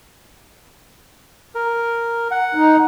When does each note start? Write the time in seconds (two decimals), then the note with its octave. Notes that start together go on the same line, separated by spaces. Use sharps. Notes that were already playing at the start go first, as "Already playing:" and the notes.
1.55 A#4
2.31 F#5
2.55 D#4